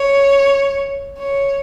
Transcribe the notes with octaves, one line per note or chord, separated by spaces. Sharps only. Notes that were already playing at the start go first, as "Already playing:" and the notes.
Already playing: C#5
C#5